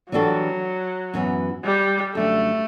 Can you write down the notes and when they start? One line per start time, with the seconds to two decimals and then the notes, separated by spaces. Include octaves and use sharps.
0.12 E3 F#3 G3 D4 F#4 A4
1.14 F#2 E3 B3
1.64 G3
2.15 F#2 D3 G3 A3